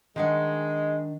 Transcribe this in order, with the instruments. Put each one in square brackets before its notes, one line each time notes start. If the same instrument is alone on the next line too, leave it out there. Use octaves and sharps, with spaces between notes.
[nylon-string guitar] D#3 D4 F#5 [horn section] G#3